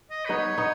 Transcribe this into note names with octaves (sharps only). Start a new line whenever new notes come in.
D#5
B4
B3 D#4 C#5
B3 D#4